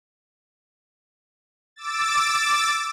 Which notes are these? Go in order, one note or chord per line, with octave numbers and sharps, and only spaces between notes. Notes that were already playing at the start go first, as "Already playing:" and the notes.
D6 E6 A6